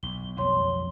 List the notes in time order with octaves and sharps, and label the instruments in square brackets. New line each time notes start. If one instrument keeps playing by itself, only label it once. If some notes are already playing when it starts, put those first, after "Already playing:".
[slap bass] B1 [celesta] G7
[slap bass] B1 F2 F3 [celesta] C#5 C6